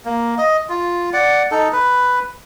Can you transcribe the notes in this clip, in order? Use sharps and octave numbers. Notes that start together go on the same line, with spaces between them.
A#3
D#5
F4
D5 F#5
D#4 A4
B4